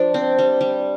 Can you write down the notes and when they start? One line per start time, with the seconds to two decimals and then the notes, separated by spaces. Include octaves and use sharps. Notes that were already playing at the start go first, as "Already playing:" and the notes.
Already playing: F3 D4
0.14 C4
0.39 G3
0.61 G3